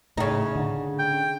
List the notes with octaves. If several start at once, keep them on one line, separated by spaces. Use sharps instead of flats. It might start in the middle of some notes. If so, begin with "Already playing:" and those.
A2 C#3 D#4
D3
G5